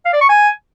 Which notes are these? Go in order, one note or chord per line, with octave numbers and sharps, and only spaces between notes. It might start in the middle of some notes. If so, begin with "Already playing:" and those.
F5
D5
C#6
G#5